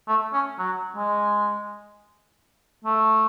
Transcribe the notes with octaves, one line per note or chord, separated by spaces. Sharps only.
A3
C#4
F#3
G#3
A3